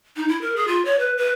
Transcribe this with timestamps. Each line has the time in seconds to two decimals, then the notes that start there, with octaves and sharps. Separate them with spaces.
0.17 D#4
0.29 E4
0.42 A#4
0.56 G#4
0.68 F4
0.85 C#5
0.99 B4
1.17 B4